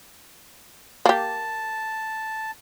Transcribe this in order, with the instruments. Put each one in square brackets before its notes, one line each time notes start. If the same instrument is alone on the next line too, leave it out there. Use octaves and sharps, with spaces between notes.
[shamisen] A#3 G4 [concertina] A5